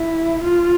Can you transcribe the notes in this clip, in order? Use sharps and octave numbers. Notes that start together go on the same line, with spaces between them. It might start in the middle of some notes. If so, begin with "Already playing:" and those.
Already playing: E4
F4